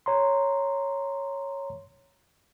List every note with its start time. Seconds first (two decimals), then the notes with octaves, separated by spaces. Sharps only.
0.06 C#5 A#5 C6